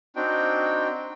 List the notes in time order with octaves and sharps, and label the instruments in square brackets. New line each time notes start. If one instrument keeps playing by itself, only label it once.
[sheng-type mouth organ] C4 D4 D#4 F#4 G5